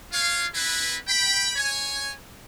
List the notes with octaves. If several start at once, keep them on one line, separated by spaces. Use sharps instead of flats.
F4 C#5 F5
C4 E4 B4
G5 B5
C#5 G#5